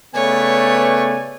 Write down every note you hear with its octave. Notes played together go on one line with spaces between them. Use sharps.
C#3 A3 B3 B4 C#5 D5 G#5